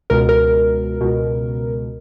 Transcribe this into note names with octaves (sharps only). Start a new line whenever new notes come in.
C#2 B2 A#4
A#4
C#2 B2